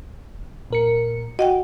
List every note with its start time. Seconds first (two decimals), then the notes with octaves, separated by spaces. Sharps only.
0.70 A#2 A#4 C#7
1.39 F#4 D#5 F#5 G5